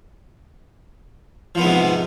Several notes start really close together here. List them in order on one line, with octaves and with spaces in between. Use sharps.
F3 B3 G#2 C3